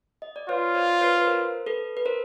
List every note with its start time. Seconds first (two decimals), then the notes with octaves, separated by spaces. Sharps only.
0.22 D#5
0.36 D5
0.49 F4 B4 C#5
0.75 C5 D5
1.01 B4 C#5
1.17 B4
1.27 A#4 C5
1.66 A4 B4
1.97 B4
2.05 A#4 C5